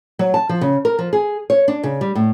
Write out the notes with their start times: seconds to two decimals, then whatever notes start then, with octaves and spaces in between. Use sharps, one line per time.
0.19 F#3
0.34 A5
0.49 F3
0.61 C#3
0.85 A#4
0.99 F3
1.13 G#4
1.50 C#5
1.68 D4
1.83 C#3
2.01 G3
2.15 A2